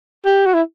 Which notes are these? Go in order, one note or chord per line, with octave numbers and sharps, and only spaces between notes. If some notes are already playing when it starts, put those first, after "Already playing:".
G4
F#4
E4